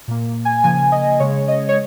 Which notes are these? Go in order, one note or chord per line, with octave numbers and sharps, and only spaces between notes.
A#2 A#3
G#5
C#3 F3 A#3 G#5
D#5
C#3 G#3 C#5
D#5
C#5